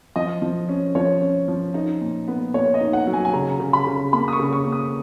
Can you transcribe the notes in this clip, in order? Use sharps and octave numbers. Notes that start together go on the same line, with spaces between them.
F3 D#5
F3
C#4
F3 C#5
C#4
F3
D#4
A#2
B3
A#2 C#5
D#5
D#4
F#5
F#3
G#5
G#5
C#3 A#5
C#3
B5
C#3
A#3 B5
D#6
C#6
C#3
C#6
A#3
D#6